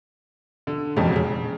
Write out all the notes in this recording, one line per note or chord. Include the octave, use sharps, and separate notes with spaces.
D3
E1 F2 G#2 C#3
C#3